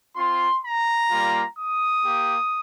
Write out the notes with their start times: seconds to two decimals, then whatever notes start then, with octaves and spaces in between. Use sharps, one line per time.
0.16 C4 F4 C6
0.63 A#5
1.10 G3 A#3 F4
1.57 D#6
2.04 A#3 G4